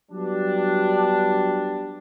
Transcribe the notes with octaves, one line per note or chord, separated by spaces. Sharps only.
F#3 G3 B3 D4